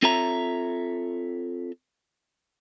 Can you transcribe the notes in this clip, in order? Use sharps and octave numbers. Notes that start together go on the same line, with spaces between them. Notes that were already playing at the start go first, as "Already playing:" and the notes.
C4 F4 A4 C#5 E5 A#5